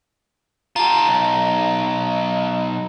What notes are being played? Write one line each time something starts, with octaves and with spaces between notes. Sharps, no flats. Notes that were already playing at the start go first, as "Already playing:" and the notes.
F4 G4 A5 A#5
B1